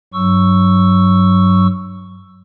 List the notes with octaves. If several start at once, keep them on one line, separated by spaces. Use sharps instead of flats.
G2 F#3 C#6 E6